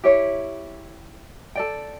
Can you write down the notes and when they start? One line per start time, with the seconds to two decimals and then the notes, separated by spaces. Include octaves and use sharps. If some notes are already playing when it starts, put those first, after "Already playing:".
0.04 E4 G4 C#5
1.55 A4 D5 G5